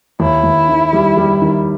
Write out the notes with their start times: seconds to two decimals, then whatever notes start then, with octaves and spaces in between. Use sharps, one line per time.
0.20 D#2 E4
0.44 D#2
0.69 D#3
0.93 G3
1.17 G3
1.42 D#3